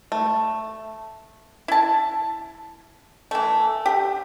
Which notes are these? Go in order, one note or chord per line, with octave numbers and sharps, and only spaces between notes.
A3
E4 A5
E3 A3
G4